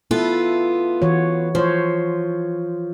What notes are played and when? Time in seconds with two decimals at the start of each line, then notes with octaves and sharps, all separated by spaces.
0.11 B3 E4 F4 A4
1.02 E3 F#4 C#5
1.55 F3 C5 C#5